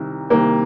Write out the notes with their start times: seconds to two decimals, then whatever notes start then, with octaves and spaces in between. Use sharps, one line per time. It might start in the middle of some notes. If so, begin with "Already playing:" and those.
Already playing: C2 C3 D#3
0.30 C2 C3 D#3 A#3